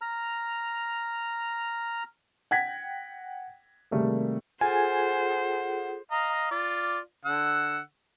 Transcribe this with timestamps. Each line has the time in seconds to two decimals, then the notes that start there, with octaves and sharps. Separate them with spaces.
0.01 A#5 F6
2.51 F#5 G5 G#6 A#6 B6
3.91 C3 D#3 G3 A3 A#3 G#4
4.61 F4 G#4 A4 C5 F#5 G#5
6.12 D#5 F5 A#5
6.51 F4 D5
7.25 D3 F#5 E6